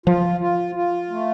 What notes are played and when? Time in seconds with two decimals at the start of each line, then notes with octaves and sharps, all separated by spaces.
0.06 F3 F4
0.41 F4
0.75 F4
1.10 A3